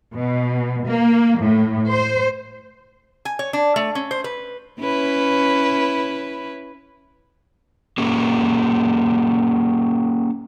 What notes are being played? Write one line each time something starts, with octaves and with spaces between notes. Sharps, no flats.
B2
A#3
A2
C5
G#5
C#5
D4
A3
C#4
C5
B4
C#4 E4 B4
A#3 C#4 G4 G#4